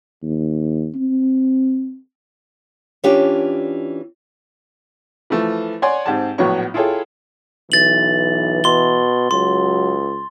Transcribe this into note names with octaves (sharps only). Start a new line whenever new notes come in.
D#2
C4
E3 C#4 D4 F4 G4
E3 F3 A3
C#5 D5 F#5 G#5 C6
G#2 C4 G4 A5
A#1 A2 F#3 B3 C#5 C#6
E4 F4 G#4 A4 C#5 G5
B1 E3 A6 F#7
B2 C6 G7
C#2 F#3 C6